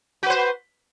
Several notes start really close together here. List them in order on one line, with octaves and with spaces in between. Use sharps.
F#4 B4 C5